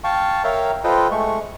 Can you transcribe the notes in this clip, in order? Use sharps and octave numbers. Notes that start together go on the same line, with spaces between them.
F5 G5 A5 C#6
A#4 C#5 E5 F5 G5 A#5
F4 A4 B4 C5 D#5 G5
G#3 A3 C#6